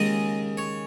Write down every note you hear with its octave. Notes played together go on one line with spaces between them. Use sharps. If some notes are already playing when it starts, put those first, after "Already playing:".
Already playing: D#2 C#3 G#3 D#5
C#5